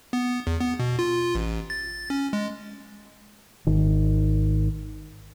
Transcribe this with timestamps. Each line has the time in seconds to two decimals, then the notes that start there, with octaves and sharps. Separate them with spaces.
0.13 B3
0.47 E2
0.60 B3
0.79 B2
0.99 F4
1.35 A1
1.70 A6
2.10 C#4
2.33 G#3
3.67 G#1 D#3